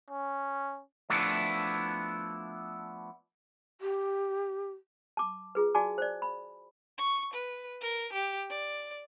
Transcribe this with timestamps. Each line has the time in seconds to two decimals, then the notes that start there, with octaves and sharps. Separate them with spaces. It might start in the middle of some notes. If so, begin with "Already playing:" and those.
0.10 C#4
1.10 F3 A3 B3 D4 E4
3.81 G4
5.17 A5 D6
5.55 F4 G#4 B4
5.75 F#4 D5 G#5 A5 D6
5.98 C5 D5
6.22 B5
6.98 C#6
7.34 B4
7.81 A#4
8.13 G4
8.50 D5